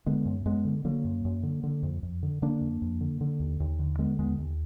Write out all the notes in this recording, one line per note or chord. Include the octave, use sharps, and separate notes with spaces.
D3 G#3 B3
F#2
F#2 G#3 B3
D3
D3 F#3 A#3
F#2
F#2
D3
D3
F2
F2
D3
D3 A#3 D4
F2
F2
D3
D3
D#2
D#2
D3
D3 G#3 B3
D#2 G#3 B3
D#2